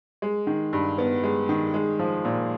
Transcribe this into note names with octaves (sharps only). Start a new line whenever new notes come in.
G#3
D#3
G2
B3
G#3
D#3
G#3
F3
A#2